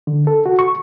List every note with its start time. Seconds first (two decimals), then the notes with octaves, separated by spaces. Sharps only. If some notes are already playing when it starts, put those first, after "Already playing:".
0.07 D3
0.27 A4
0.46 F#4
0.59 C#6